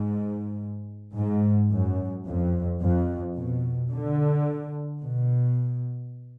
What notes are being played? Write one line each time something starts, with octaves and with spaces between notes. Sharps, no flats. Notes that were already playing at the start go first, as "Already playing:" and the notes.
Already playing: G#2
G#2
F#2
F2
F2
B2
D3
B2